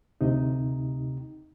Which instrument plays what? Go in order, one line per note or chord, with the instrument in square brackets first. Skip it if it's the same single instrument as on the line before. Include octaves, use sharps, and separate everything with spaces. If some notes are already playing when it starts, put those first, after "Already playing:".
[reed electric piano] D2 C3 D#4